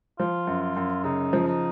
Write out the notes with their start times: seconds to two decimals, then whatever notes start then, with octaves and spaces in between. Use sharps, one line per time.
0.19 F3 F4
0.47 F#2
0.62 F4
0.77 F#2
1.04 C#3 D#4
1.33 F3
1.47 D#4